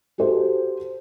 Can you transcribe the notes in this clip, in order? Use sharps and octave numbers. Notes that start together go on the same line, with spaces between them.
F#4 G4 A4 C5